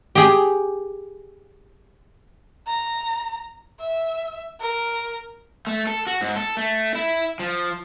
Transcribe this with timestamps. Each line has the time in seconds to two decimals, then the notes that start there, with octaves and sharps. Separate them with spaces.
0.15 G4 G#4 G#5
2.67 A#5
3.80 E5
4.60 A#4
5.67 A3
5.87 A4
6.07 F#4
6.21 G#2
6.36 A4
6.57 A3
6.95 E4
7.40 F3